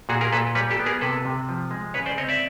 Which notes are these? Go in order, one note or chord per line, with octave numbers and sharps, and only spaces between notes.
A#2 F#4 G#4
G#4 A#4
A#2 A4 B4
G3 B4 C#5
G4 A4
B3
G#4 A#4
C3 A4 B4
C3
F3
G#3
C#3 B4 C#5
C5 D5
C4 C#5 D#5
D5 E5